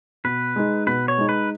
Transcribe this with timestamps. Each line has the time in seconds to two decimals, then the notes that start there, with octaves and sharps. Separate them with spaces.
0.24 B2 B4
0.56 G#3 D#4
0.87 B2 B4
1.08 C#5
1.18 G#3 D#4
1.29 B4